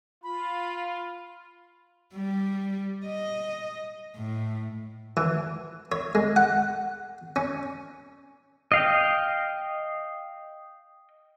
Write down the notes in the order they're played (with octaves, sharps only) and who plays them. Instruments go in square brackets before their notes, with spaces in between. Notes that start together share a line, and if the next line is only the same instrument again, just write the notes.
[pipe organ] F4 [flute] B5
[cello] G3
D#5
A2
[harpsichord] E3
C#5
G#3
F#5
C#4
[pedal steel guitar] D#5 F5 G5